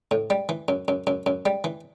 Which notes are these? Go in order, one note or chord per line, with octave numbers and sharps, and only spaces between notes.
A2
G3
E3
F#2
F#2
F#2
F#2
G3
E3